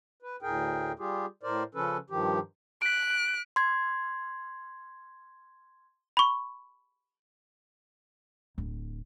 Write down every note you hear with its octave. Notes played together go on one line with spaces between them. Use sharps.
B4
D2 A2 G#4 A#4 G5
G3 F4 G4 G#4
A2 A#4 C5 D5
C#3 F3 C#4 A4 B4
G2 D#3 F3 G4
F#6 B6 D7
C6 G#6
B5 C#6
D1